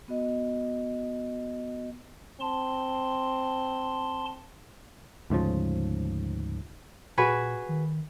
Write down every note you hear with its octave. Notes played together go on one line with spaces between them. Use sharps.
B3 F#4 D#5
C4 A5 C6
D2 G#2 C#3 F3
A#2 F#4 G#4 B4
D#3